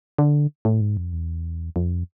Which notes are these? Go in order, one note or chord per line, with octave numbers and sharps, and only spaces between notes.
D3
A2
G#2
F2
E2
F2